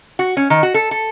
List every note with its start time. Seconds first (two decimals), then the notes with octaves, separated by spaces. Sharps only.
0.19 F#4
0.37 C#4
0.50 D#3
0.63 F#4
0.74 A4
0.91 A4